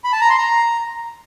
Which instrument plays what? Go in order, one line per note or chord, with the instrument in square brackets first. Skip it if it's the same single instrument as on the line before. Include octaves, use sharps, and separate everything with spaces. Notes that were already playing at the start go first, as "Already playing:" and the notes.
[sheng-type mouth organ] B5
A5
A#5
C6
A#5